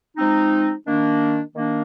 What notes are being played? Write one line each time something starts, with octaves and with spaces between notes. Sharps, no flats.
F3 G#3 C4 D#4
D#3 A#3 D4
D#3 A#3 D4